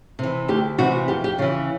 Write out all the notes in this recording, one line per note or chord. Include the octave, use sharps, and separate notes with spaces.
C3 E3
D2 G4
C3 E3 F#4
F2 G4
G4
C#3 E3 F4